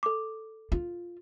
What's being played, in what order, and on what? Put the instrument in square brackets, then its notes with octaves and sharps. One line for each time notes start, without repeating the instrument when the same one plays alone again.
[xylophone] A4 D6
[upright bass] F4